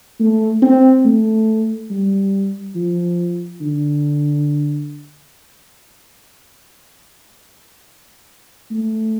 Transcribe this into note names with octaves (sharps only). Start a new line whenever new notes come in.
A3
C4
A3
G3
F3
D3
A3